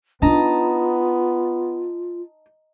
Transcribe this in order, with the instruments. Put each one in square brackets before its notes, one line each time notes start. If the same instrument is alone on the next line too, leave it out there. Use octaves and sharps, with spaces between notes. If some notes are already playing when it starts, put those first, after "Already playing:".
[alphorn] B3 [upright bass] D4 D#4 [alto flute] F4 [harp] D#5 A5 A#5